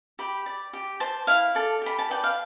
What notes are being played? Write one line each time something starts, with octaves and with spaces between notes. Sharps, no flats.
G4 B5
D5
G4
C5 A5
E4 F5
A4 D5
G4 B5
A5
B4 D5 G5
F5